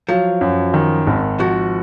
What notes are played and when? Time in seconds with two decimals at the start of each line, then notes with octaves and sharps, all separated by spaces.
0.09 F3 F#3
0.41 F#2
0.74 D#3
1.07 G#1
1.40 F3 F#4